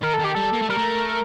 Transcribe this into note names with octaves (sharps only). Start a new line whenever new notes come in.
D#3 A#4
A4
D#3 G4
G3 A4
A#3
A3
G3 A#4
A3